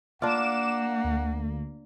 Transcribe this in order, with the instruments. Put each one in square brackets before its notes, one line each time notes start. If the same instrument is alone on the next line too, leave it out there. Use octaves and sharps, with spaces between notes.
[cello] A#3 [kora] D4 F4 [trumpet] F#5 [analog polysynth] D6 E7
[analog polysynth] D2